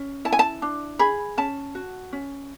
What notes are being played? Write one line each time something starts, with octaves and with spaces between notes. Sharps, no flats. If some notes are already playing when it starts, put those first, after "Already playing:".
Already playing: C#4
E4 A5
G#5
A5
D4
G#4 B5
C#4 A5
F#4
C#4